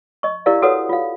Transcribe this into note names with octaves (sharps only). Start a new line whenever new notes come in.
D#5 C#6
E4 G4 A#4 D5 F5
F#4 A4 B4 C#5 F#5 D#6
F4 F5